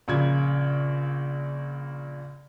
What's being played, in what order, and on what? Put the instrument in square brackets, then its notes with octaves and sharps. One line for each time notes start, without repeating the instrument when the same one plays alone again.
[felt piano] A#1 C#3 G#6